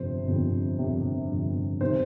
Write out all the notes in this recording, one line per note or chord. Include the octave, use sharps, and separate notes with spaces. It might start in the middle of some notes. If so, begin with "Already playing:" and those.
Already playing: G1 F2 C3 C5
G1 F2 C3
G1 F2 C3
G1 F2 C3
C3 D#3 C5